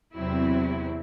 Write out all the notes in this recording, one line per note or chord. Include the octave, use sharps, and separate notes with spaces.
E2 C3 F#3 C4 E4